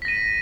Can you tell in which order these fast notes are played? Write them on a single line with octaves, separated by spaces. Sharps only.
B6 A#6 D#7